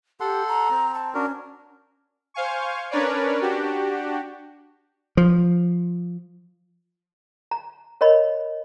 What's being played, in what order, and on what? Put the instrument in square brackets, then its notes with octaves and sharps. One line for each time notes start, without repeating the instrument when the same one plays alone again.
[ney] G4 [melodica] A4 F#5 C6
[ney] A#5
[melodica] C4
[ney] A5
[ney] C#4 [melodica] D4 F#4 A#4
[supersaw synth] C5 F5 G#5 C#6
C#4 D4 A#4 B4 C#5 D5
D4 F#4 G4
[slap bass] F3
[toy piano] A#5
A#4 C#5 D#5 B5